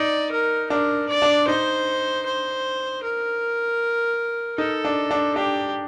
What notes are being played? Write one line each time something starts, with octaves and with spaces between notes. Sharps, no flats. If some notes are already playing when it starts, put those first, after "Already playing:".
Already playing: D#4 D5
A#4
D4 A#4
D5
D4
D#4 C5
C5
A#4
D#4 A4
D4
D4
D4 G4